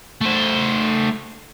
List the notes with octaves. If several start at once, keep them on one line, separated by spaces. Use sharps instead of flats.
A3 C5